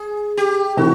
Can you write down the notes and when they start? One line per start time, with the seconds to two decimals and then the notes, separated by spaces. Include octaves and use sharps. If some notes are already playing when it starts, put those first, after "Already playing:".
Already playing: G#4
0.37 G4
0.77 C3 E3 F#4